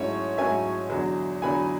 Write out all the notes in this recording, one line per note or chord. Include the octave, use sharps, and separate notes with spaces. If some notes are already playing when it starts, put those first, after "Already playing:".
Already playing: G#2 F#3 A3 C#4 E4 C#5
G#2 F#3 A3 C#4 E4 E5 G#5
E2 D3 F#3
E2 D3 F#3 G#5 B5